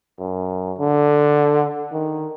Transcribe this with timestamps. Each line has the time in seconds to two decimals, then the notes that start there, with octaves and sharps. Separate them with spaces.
0.19 F#2
0.78 D3
1.92 D#3